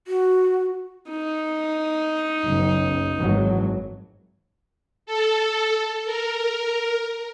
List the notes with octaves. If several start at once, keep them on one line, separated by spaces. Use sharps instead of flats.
F#4
D#4
F#1 B1
G#1 E3 F#3
A4
A#4